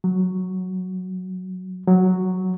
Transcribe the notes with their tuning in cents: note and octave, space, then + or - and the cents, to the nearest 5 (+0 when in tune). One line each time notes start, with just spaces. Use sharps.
F#3 +0
F#3 +0